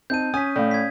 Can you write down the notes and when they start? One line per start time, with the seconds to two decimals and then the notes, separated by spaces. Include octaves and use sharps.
0.10 C4 D#4 A5 G6 D#7
0.34 C#4 G#5 D#6 B6
0.56 A2 D5 F5
0.71 G#6 B6